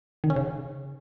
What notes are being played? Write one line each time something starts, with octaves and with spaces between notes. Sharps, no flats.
D#3
C#4
C#3